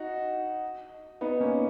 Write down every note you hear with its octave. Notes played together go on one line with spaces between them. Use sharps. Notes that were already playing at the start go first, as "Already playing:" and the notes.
Already playing: D#4 F#4
B3 D#4
A#3 C#4